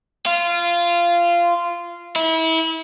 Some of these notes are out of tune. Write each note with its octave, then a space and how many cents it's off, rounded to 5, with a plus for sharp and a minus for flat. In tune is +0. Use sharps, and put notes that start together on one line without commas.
F4 -15
E4 -30